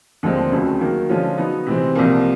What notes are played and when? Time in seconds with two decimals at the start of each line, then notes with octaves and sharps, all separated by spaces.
0.23 D#2 D3 F3 G#3 C4
0.52 C#2 C#3 F#3 A3 C4
0.81 D#3 F#3 A#3
1.09 D3 F3 G#3 C#4 F4
1.38 F#3 B3 D#4
1.67 C3 E3 G#3 C4
1.95 C2 C3 F3 A#3